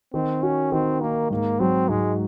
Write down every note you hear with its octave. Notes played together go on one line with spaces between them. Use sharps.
D#3 C4
C#4 F#4
D#3 C4
A#3 D#4
G#2 A#3
F#3 C4
G#2 G#3